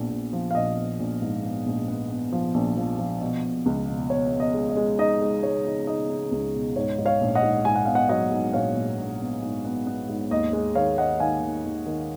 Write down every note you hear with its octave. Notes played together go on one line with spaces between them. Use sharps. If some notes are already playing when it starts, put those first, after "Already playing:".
Already playing: A#1 B3
A#1
F3
F5
A#1 D#5
B3
A#1
G#2
B3
A#1
B3
B3
F3
A#1
F3
F3
B2
B2
C#2
B2
B2 C#5
B2
D#5
G#3
D#5
G#3
D#4 D#5
G#3
G#3 C#5
D#4
D#4 D#5
D#4
C#2
B2
G#2 C#5
G#2
C#5 F5
A#1
D#5 F#5
G#2
G#2 G#5
F#5
B3 F5
D#5 F#5
F#3 D#5 F#5
G#2
A#1 C#5 F5
A#1
A#1
B3
G#2
B3
B3
G#2
D#2 D#5
G#3
D#3 C#5 F5
G#3 D#5 F#5
D#3 F5 G#5
D#3
D#2
D#3